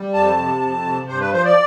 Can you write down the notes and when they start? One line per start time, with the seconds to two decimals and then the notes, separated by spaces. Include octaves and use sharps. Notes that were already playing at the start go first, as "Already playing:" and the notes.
Already playing: G3
0.14 F2 A5
0.37 C3
0.62 F2
0.84 C3
1.08 G2 C5
1.20 B4
1.32 F3 C5
1.45 D5